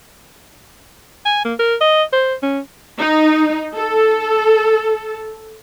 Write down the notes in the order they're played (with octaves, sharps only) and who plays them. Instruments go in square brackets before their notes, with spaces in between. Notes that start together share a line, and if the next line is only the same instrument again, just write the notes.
[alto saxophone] G#5
A#3
A#4
D#5
C5
C#4
[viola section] D#4
A4